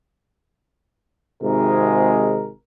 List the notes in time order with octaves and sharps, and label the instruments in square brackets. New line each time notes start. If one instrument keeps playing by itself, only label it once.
[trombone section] G#1 G#2 C3 G#3 G#4 A#4